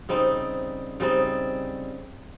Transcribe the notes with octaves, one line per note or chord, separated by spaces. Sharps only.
C#3 G3 C4 D#4
C#3 G3 C4 D#4